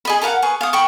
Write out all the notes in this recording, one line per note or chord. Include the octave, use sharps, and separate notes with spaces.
G#4 D#5 B5
A4 A#4 F5 F#5
G#4 B4 C#6
F5 D#6
G5 B5 C#6